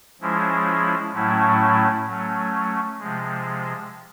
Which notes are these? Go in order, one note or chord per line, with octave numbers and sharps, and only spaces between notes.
F3 G#3 C#4 E4
A2 F#3 A3 C#4 E4
F#3 A3 C#4
C3 F3 G#3